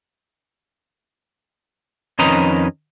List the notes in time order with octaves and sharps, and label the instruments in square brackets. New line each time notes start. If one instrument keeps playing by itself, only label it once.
[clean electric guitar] F2 D#3 C#4 B4 D#5 A#5